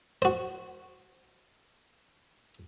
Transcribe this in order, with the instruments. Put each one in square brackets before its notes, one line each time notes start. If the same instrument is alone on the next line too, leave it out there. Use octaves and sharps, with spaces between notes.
[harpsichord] F#4 C5